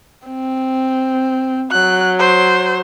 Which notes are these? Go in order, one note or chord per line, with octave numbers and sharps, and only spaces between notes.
C4
F#3 F#6
C5